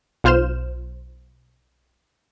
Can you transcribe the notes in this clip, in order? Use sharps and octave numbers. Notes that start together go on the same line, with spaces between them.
B1 F4 C5 F6 G6 E7